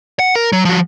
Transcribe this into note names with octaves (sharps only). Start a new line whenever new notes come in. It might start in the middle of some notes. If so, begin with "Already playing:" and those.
F#5
A#4
F#3
F3 F#4